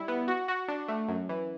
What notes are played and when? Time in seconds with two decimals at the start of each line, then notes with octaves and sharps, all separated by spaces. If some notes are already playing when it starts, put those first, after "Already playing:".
Already playing: G3 E4
0.08 B3
0.28 F#4
0.48 F#4
0.68 D4
0.88 A3
1.09 F#2
1.29 E3